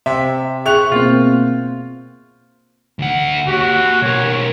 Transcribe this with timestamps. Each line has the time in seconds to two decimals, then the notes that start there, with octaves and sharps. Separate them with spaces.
0.06 C3 E5
0.66 G#4 E5 G5 C#6 F#6 F7
0.92 B2 A#3 C4 F4
2.99 D2 F#5
3.48 F#4 G4 C#5
4.02 B1 A#4 C#5